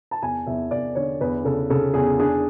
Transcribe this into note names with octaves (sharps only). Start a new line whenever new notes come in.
A5
E2 G#5
E2 E5
E2 D5
D3 C#5
E2 B4
C#3 A4
C#3 A4
E2 G#4
D4 G#4